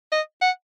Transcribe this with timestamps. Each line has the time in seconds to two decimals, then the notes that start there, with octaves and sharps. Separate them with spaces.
0.12 D#5
0.41 F#5